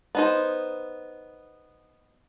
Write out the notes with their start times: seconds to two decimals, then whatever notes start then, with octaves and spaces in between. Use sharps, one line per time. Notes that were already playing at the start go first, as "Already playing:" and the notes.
0.15 B3 D#4 C5